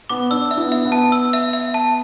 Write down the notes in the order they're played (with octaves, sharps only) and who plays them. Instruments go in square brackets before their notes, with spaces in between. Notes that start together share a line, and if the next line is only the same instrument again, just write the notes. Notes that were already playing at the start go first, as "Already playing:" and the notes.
[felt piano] B3 [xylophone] D6
[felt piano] D4 [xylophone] E6
[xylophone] E5
[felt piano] B3 E4
[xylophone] E5
[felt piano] B3
[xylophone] A5
E6
E5
E5
A5